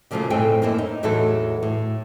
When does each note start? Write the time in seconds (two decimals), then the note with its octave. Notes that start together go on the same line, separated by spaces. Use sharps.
0.11 A#2 C#3 F3 F#3 A3 F4
0.30 F2 A2 C4 A4 G5 G#5
0.62 F#2 A2 A#3 D#4 E4
0.78 D#4
1.03 E2 A2 E3 F#3 A4
1.63 A2